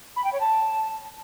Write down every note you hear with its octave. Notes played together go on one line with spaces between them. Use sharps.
B5
G5
C#5
A5